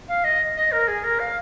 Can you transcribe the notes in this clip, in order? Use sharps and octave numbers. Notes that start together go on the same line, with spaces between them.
F5
D#5
D#5
A#4
G#4
A#4
F5